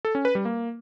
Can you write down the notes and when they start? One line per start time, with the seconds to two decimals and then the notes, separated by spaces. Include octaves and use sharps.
0.05 A4
0.15 C#4
0.25 B4
0.35 G3
0.45 A#3